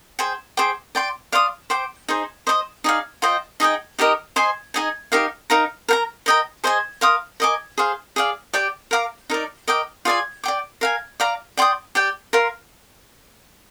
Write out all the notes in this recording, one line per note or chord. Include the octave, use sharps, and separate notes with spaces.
G#4 C5 G5
G#4 C5 G5 D6
D5 G5 C6
D5 F5 C6 D#6
C5 G5 D6
D#4 G#4 C5
C5 D#5 A#5 D#6
D#4 G#4 D5 F5
F4 C5 D#5 G5
D#4 G#4 D#5 G5
D#4 G4 A#4 D#5
C5 D#5 G#5 C6
D#4 G#4 D#5 G#5
D#4 G4 A#4 F5
D#4 A#4 F5 A#5
A#4 F5 A#5
A#4 D#5 G5 A#5
G#4 C5 D#5 G#5
A#4 F5 C6 D#6
A#4 D#5 G#5 D6
G#4 C5 F5
G#4 D5 F5
G4 D5 G5 D6
A#4 F5 A#5 D6
D#4 A#4 D5
A#4 D#5 G5 D6
F4 G#4 D5 G#5
D5 G5 D6
A#4 F5 G#5
D5 F5 A#5 D6
D5 G5 C6 D#6
G4 D5 G5
A#4 F5 C6